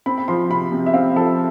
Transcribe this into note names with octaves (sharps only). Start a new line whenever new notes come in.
C4 B5
B5
F3 C6
C3 B5
C3
E5
C4 F5
F3 A4